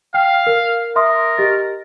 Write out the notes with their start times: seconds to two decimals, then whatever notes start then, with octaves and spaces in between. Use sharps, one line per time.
0.14 F5 G5
0.47 A#4
0.96 A#4 E5 C6 D#6
1.38 G4 D#5 A6